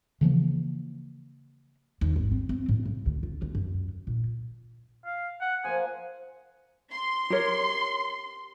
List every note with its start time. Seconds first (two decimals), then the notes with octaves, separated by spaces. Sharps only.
0.21 C#3 E3 F3 A#3
2.01 D#2
2.16 G#1
2.32 C4
2.49 C4
2.69 A2
2.85 C#3
3.06 D2
3.23 F4
3.42 D2
3.55 F#2
4.07 A#2
5.06 F5
5.41 F#5
5.65 F3 A#3 G#5
6.91 C6
7.30 G4 A#4 C#5